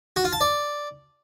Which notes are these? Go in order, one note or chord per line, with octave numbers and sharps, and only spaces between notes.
F#4
F4
A5
D5